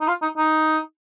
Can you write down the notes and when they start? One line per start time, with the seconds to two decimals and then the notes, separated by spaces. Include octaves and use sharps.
0.01 D#4
0.08 F4
0.22 D#4
0.37 D#4